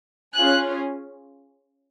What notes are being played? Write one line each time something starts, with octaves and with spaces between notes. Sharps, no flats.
C#4 F4 G#4 F#6